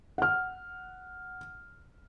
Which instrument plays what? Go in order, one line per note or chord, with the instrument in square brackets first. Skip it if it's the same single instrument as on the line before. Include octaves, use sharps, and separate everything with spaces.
[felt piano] F#5 F6